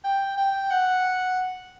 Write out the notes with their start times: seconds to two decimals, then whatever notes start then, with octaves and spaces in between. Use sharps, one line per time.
0.04 G5
0.37 G5
0.70 F#5